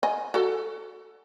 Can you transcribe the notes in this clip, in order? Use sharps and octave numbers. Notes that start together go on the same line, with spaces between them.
D#5 G#5
F#4 A4